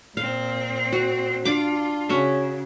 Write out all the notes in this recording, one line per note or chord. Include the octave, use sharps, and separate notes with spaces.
A#2 C4 F5
F#4
D4 F4 D6
C#3 C#4 F#4 E5